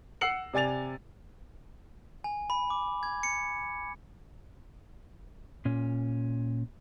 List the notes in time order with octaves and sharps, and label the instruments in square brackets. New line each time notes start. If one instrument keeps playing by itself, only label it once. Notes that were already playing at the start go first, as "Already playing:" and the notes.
[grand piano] F#5 E6 C7 C#7 F#7
C3 D5 G#5 A6 F7
[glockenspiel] G#5
B5
D6
G#6
C#7
[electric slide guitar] A#2 C#4